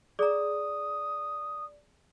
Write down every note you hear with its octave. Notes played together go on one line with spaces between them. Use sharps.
G#4 D5 A#5 D#6